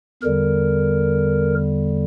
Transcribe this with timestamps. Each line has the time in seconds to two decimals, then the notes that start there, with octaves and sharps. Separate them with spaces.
0.22 E2 D3 G3 A#4